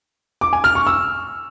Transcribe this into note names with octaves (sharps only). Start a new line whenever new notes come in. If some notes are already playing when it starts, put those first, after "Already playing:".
D6
G#5
F6
C#6
E6